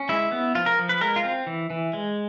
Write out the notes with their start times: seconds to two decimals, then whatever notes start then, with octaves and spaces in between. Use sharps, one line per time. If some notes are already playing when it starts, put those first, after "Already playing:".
Already playing: C#4
0.09 G#3 E4
0.32 B3
0.55 F3 F4
0.66 A#4
0.79 F3
0.89 B4
1.01 G#3 A#4
1.16 F4
1.24 C4
1.47 E3
1.70 E3
1.93 G#3